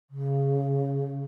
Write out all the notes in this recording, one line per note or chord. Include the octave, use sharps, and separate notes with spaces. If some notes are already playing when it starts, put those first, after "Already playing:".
C#3